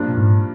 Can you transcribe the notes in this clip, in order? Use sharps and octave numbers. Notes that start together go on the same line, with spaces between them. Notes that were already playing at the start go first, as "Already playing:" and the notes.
Already playing: G2 F3 A#3 D4
A#2
G#2